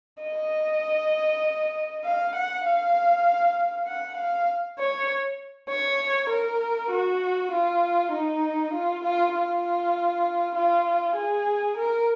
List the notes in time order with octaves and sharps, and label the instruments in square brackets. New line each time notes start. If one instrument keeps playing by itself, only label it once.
[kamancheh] D#5
F5
F#5
F5
F#5
F5
C#5
C#5
A#4
F#4
F4
D#4
F4
F4
F4
F4
G#4
A#4